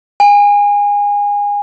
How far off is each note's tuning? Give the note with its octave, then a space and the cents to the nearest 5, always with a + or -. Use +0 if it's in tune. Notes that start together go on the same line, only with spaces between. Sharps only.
G#5 -25